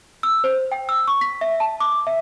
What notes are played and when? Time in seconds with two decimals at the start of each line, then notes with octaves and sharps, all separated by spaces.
0.23 E6
0.44 C5
0.72 G5
0.89 E6
1.08 C#6
1.21 B6
1.41 E5
1.60 A5
1.80 D6
2.07 E5